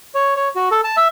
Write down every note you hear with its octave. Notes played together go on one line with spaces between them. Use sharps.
C#5
C#5
F#4
A4
A5
E5